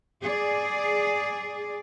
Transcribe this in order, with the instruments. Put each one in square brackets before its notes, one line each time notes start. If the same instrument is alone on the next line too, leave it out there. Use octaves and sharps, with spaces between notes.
[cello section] G#4 D5